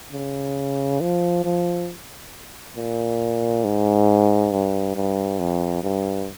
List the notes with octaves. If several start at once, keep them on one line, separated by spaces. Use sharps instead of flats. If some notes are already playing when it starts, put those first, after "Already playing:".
C#3
F3
F3
A#2
G#2
G2
G2
F2
G2